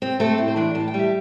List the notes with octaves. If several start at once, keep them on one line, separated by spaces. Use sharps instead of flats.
C4
A3 C4 A4
A2
C5
E3 D4 D5
A2 A5
G5
G3
E5